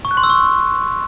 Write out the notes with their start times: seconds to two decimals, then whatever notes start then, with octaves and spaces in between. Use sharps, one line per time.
0.05 C#6
0.11 F#6
0.17 C6
0.23 E6
0.30 C#6